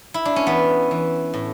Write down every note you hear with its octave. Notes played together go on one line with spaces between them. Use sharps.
E4
D4
C#4
E3 B3
E3
A2